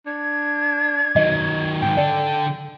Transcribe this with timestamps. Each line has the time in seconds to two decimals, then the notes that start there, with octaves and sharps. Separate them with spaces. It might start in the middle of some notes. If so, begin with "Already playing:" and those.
0.07 D4 G#6
1.16 D#3 F#3 D#5
1.82 G#2 D#3 G5
1.97 D3 A4 D5